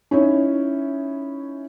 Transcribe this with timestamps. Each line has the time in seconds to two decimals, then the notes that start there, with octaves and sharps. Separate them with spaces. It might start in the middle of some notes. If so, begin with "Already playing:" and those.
0.11 C#4 D#4 E4 C#5